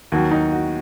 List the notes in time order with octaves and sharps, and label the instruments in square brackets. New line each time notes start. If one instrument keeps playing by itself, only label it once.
[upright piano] D#2 D#3 F#3 F#4
D#4
F#4